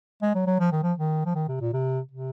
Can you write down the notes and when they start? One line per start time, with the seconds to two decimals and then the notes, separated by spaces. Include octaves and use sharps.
0.22 G#3
0.35 F#3
0.47 F#3
0.60 F3
0.72 D#3
0.83 F3
0.98 D#3
1.25 F3
1.35 D#3
1.48 C3
1.61 A#2
1.73 C3
2.11 C3